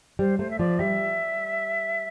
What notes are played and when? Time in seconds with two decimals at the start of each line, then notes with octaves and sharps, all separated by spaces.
0.19 G3 C5
0.39 A3 C5
0.50 E5
0.59 F3 D5
0.79 G3 E5